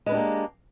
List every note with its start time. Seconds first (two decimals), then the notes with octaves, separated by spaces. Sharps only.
0.06 G#3
0.09 B4
0.12 D4
0.14 G4
0.17 A#3